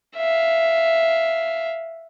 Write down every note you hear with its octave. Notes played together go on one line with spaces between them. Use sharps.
E5 F5